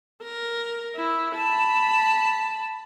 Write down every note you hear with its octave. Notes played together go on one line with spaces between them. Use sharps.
A#4
E4
A5 B5